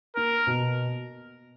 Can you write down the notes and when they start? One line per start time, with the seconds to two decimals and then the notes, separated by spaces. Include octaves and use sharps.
0.16 A#3 A#4
0.47 B2